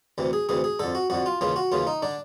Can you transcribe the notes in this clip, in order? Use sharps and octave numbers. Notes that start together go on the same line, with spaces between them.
D2 C3 E3
G#4
D2 C3 E3 G#4
G#4
F2 D3 A4
F#4
F2 D3 F#4
F4
D#2 C#3 E3 F4
F#4
D#2 C#3 E3 F4
D#4
D3 D4